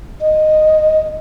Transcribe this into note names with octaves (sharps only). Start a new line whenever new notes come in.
D#5